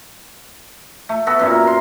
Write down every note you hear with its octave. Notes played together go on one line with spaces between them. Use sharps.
A3
B3 F#4 A4 E5
F#2 A#2
A#4
A#4 C6